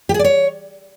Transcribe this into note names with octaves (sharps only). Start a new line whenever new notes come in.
G4
G#4
D5
C#5